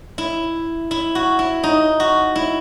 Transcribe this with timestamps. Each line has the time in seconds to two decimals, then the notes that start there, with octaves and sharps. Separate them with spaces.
0.18 E4
0.91 E4
1.15 F#4
1.39 E4
1.63 D#4
2.00 F#4
2.36 E4